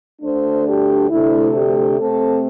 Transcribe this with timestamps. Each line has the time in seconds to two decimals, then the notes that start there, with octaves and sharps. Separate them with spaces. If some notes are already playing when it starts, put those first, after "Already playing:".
0.22 D2 D3 A3 D4 C5
0.66 G4
1.10 D2 C3 A3 D4 E4
1.54 G4
1.98 C3 A3 C4 A4